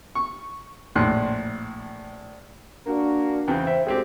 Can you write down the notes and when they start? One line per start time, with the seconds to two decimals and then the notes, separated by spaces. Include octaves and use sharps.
0.15 C#6
0.95 A#1 A2 C6 F#6
2.86 A#3 D4 F#4 A#4
3.48 E2 C#3 C4 G5
3.67 C5 E5
3.86 D2 G#3 C4 G4 G5